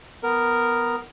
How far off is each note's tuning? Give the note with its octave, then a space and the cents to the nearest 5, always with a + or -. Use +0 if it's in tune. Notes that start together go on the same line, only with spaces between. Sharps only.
B3 +0 A#4 +0